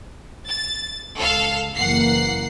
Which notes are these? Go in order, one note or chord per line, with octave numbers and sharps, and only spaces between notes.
A6
C#2 A4 F5
F#1 E3 A#3 F#5 C7